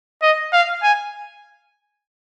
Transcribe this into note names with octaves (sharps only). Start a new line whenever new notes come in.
D#5
F5
G#5